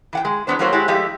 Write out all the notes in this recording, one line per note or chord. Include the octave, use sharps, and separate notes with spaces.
E3 F#5 G5
G#3
E2 G2 B3 D4 C5
F#3 A3 A#3 F#4 C5 C#5
G#3 E4 F#4 G4
F3 G#3 A3 G4 D#5 E5